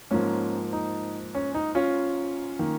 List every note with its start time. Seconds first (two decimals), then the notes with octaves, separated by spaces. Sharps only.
0.11 G#2 F3 A#3 C#4
0.73 D#4
1.35 C#4
1.55 D#4
1.75 C#4 F4
2.59 D#3 A#3